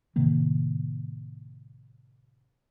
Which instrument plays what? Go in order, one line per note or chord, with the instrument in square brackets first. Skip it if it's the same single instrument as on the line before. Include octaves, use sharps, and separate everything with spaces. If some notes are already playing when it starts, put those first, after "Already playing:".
[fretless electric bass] A2 C3 D#3 A#3